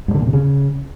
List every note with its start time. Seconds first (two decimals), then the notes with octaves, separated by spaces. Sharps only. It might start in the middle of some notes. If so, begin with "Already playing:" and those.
0.08 G2
0.14 D3
0.21 A#2
0.27 C3
0.33 C#3